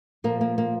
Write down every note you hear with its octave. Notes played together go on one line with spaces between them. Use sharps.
A#2 F3 A#3
A#3
A#3